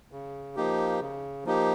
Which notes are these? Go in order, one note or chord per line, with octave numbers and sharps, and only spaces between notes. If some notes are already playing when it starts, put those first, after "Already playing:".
C#3
F3 A#3 D#4 G4
C#3
F3 A#3 D#4 G4